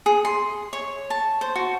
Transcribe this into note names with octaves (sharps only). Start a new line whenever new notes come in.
G#4
C6
C#5
A5
C5
F#4